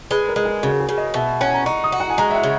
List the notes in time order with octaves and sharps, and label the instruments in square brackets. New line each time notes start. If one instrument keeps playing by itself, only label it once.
[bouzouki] G#3 [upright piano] B4
[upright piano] A#4
[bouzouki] G#3
[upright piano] G#4
[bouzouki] C#3 [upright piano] F#4
[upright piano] G#4
[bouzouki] C#3
[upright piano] D#5
[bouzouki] B2 [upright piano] E5
[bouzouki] C#4 [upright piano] F#5
[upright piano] A#5
[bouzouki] D#4 [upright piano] C#6
[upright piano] D#6
[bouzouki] F#4
[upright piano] F#5
G#5
[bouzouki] G#3 [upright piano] A#5
[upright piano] E5
F#5
[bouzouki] C#3